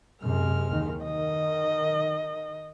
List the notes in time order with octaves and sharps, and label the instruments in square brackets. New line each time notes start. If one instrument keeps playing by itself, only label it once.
[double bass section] F#2 C3 [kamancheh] G#3 F6
[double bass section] D#2 D#3
[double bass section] D#3 [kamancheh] D#5